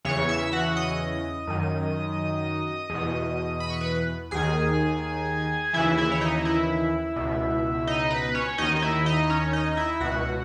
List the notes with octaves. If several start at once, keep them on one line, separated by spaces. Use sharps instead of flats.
E2 C#3 E3 C#5 C#6
E5 E6
F#4 F#5
D#5 D#6
F#2 D#3
E2 B2
B5
C#6
B4 B5
D#2 D#3 G#4 G#5
D#2 C#3 E3 E4 E5
E4 E5
C#5
D#4 D#5
E4 E5
C#2 B2
D#4 D#5
B4
C#4 C#5
D#2 D#3 D#4 D#5
D#5
E4 E5
D#4 D#5
C#4 C#5
D#4 D#5
E4 E5
C#2 B2 F#4 F#5